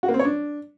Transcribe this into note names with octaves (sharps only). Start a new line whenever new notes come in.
F#4
A#3
C4
C#5
D4